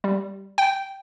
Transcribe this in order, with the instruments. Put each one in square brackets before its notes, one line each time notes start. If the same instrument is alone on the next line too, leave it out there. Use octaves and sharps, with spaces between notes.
[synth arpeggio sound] G3
G5